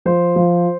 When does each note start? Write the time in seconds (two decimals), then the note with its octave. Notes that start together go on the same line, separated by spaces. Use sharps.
0.05 F3 C5
0.36 F3